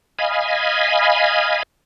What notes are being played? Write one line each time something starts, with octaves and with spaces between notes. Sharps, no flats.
D#5 F5 G#5 B5